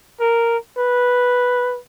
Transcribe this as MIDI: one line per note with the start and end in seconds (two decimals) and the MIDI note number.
0.20 0.57 70
0.77 1.79 71